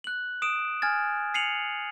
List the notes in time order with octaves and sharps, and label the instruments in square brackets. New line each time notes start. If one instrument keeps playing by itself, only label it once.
[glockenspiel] F#6 F#7
D#6 D7 E7
G#5 F6 G#6 A6
C7 C#7 D#7 F7 F#7